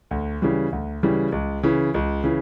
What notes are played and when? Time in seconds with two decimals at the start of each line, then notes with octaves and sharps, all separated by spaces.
0.11 D2
0.42 C#3 E3 G3
0.72 D2
1.03 C#3 E3 G3
1.32 C#2
1.63 C#3 E3
1.94 C#2
2.24 C#3 E3